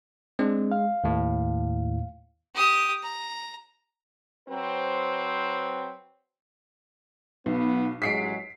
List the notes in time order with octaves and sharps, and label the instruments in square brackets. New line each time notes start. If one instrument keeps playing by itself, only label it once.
[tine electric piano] G#3 [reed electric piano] C4 D4
[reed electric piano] F5
[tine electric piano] D#2 A2
[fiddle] G4 D#6
A#5
[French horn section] F#3 C4 B4 C5
[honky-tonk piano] B1 [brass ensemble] B3
[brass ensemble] A1 F#3 G#3 [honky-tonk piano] B6 C7 D7